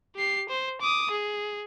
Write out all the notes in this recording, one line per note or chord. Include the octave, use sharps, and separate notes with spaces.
G4 C7
C5
D6 D#6
G#4